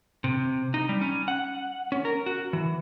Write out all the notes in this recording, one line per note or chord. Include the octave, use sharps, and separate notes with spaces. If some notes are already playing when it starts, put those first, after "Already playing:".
C3
D#4
G3
C#4
F#5
C#4
A#4
F#4
E3